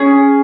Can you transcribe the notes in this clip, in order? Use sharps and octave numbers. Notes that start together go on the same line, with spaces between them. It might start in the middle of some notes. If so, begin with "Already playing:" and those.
Already playing: C#4 G#4